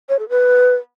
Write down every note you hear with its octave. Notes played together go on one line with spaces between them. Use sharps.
C#5
A4
B4